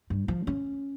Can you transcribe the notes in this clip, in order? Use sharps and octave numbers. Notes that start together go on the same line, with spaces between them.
G2
F3
C#4